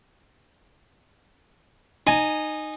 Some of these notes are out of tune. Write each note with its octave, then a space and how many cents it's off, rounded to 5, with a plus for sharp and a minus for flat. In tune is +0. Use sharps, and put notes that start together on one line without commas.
D#4 -15 G#5 +0